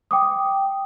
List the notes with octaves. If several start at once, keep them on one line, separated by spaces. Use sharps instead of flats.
G5 D6 D#6